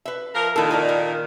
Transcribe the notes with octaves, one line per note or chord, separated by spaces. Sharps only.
B4 E5
F3 A#4
A#2 D#3 E4 A4
D#4 A#4 D5
A#4